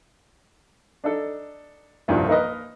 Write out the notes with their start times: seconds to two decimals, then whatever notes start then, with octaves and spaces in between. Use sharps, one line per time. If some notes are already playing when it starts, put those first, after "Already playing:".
1.04 D4 D#4 A4
2.08 C2 G2 A#2 D#3 F3 G3
2.28 A#3 D#4 A#4 B4 D#5